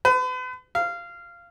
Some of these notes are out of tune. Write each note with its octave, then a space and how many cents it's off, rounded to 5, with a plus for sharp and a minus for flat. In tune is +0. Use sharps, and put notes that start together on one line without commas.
B4 +40
F5 -15